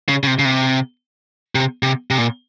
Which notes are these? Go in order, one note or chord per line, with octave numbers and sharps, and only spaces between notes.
C#3
C#3
C3
C#3
C3
C3
C3
C3
A#2